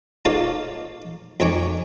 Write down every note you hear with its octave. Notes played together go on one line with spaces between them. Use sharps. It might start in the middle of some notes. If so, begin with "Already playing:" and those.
D#4 F4 A4 C#5 D5 F5
F2 D#4 C#5 G#5 C#6 D6